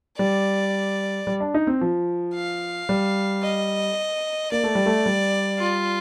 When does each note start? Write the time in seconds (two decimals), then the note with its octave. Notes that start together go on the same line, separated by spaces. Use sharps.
0.18 G3 D5
1.27 G3
1.40 D4
1.54 D#4
1.67 C4
1.81 F3
2.34 F5
2.89 G3
3.43 D#5
4.52 A#3 D5
4.63 A3
4.75 G3
4.86 A3
5.06 G3
5.59 F4